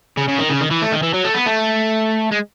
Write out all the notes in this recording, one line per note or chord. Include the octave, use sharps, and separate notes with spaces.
C#3
C#3
D#3
C#3
D#3
E3
A3
D#3
E3
F#3
A3
B3
A3
G#3